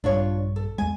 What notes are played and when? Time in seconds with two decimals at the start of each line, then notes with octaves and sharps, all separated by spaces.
0.04 A#1 G2 G3 D4 F4 C#5
0.56 A4
0.78 E2 G#3 G#5